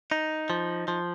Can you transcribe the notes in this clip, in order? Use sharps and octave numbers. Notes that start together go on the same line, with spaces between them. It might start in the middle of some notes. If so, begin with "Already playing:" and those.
D#4
F3
F3